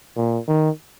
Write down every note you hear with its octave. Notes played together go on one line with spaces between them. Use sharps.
A#2
D#3